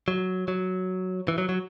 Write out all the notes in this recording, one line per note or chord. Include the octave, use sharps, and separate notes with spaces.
F#3
F#3
E3
F#3
F#3